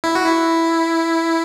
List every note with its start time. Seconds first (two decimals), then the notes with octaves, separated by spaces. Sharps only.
0.04 E4
0.15 F#4
0.26 E4